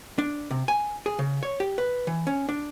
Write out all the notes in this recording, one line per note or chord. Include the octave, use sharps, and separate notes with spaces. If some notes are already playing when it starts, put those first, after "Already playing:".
D4
C3
G#5
G#4
C#3
C#5
G4
B4
E3
C#4
D4